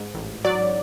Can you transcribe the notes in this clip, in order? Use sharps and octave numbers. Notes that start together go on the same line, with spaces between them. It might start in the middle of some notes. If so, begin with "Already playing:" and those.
Already playing: G#2
A1
F#3 D5